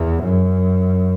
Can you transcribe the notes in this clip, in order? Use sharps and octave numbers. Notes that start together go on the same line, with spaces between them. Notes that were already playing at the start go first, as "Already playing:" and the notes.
Already playing: E2
F#2